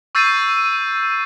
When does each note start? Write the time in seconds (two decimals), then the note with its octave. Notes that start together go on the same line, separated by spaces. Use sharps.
0.15 C#6 E6 G6 A6 C7 D#7